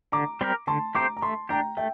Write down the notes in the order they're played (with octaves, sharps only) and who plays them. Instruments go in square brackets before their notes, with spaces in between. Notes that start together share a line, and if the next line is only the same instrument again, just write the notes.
[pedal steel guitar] D3 [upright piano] A#5 D6
[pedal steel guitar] G3 C4 G4 A#4
[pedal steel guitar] D3 [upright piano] A5 C6
[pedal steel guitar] A3 C4 G4 C5 [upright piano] A#5 D6
[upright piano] A#5
[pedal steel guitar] A3 [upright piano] A5 C6
[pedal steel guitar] D4 G4 [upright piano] G5 A#5
[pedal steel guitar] A3 [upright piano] E5 G5